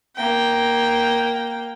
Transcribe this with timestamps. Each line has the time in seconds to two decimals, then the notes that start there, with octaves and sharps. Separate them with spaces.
0.16 A#3 G5